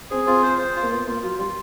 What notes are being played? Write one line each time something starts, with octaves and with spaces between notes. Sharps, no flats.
C4 G#4
C4 F4
C5
C5
F4
A#3
B3 F4
A#3 F4
F#3 F4
G3 F4